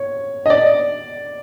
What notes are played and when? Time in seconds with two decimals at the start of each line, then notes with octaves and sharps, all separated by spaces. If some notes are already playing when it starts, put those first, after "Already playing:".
Already playing: C#5
0.46 D#5
0.50 D5